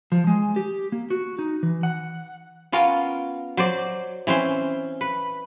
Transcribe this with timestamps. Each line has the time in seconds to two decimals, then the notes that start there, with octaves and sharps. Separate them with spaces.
0.12 F3
0.27 G#3
0.56 G4
0.92 A#3
1.10 F#4
1.39 D#4
1.63 E3
1.83 F#5
2.72 B3 C#4 F4 A#4
3.57 F#3 C5 D5
4.27 E3 C4 C#4 C5
5.01 B4